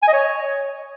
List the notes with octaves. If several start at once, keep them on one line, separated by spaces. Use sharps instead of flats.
G#5
D#5
C#5